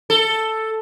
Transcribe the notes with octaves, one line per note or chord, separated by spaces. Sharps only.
A4